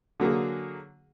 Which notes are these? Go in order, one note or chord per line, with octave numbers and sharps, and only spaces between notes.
D3 F#3 A#3 G#4